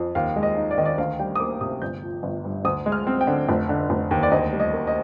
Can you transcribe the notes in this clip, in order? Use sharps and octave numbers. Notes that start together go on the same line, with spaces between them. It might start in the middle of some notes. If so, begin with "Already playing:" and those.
Already playing: F2
D#2 F5
G#3
D#5
D#4
D5
D#3 D#5
D5
D2 F5
G3 G5
D#6
A#3 D6
C3 D#6
G1 G6
F3
G1
G2
D2 D#6
G#3
F6
C4
G5
D3
F1
D3
F1
D#2
D5
D2 D#5
G3
D#5
A#3
D#5